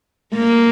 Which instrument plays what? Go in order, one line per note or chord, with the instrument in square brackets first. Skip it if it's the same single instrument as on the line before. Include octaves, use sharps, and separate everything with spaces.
[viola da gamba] A#3